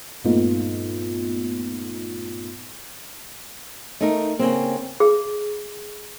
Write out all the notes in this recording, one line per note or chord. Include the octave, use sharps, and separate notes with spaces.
G2 A#2 A3 B3 D#4 F4
A3 D#4 A#4
C#3 A#3 C4
G#4